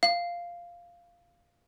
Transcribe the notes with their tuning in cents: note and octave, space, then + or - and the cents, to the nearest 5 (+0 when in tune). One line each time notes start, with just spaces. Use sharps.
F5 -5